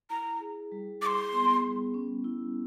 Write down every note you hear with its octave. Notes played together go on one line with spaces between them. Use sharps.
E4 A#5
G#4
G3
G#4 C6 D6
B3
G3
C#4
E4